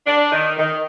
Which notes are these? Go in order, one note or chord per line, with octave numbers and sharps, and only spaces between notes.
D4
D#3
D#3